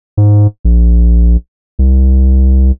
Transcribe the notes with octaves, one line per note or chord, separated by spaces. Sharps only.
G#2
A#1
C2